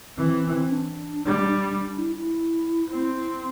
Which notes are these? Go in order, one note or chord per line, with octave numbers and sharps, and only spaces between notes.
E3 C4
C4
D4
G3
D4
E4
E4
C4